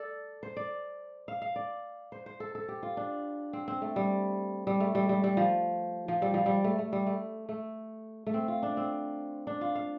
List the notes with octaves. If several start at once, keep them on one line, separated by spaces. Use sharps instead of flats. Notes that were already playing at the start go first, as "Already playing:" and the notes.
Already playing: A4 D5
C5
D5
F5
F5
D5
C5
C5
A4
A4
G4
F4
D4
C4
C4
A3
G3
G3
A3
G3
G3
G3
F3
F3
G3
F3
G3
A3
A3
G3
A3
A3
A3
C4
F4
D4
C4
D4
F4
F5